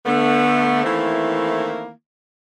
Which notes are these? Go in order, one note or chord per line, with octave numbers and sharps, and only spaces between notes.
D3 A3 B3
D#3 E3 A3 A#3 C4 E4